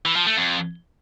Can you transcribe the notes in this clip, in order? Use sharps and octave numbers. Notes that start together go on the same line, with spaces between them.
E3
F3
A3
F2